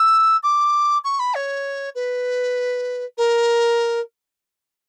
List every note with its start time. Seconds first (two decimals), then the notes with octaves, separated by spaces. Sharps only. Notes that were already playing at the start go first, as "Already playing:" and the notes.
Already playing: E6
0.43 D6
1.04 C#6
1.19 B5
1.35 C#5
1.95 B4
3.18 A#4